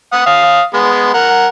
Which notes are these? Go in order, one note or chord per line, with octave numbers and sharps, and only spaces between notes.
F#5 D#6
F5 D#6
G#3 B3
A#4 F#5